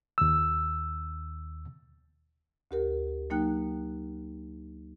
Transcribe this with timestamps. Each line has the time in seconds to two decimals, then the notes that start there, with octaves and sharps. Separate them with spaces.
0.18 D#2 E6
2.71 D2 G4 A#4
3.30 F#3 A#3 D#4 G5 F#6